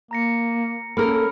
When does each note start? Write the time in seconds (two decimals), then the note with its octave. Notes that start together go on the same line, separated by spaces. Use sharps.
0.11 A#3 A#5 A#6 C#7
0.97 A#3 C#4 A4 A#4 B5 F6